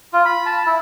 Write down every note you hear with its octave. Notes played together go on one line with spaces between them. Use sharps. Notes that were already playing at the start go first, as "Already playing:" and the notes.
F4
B5
A5
E4